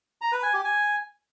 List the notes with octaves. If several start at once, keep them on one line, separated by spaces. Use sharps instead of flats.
A#5
B4
G#5
G4
G#5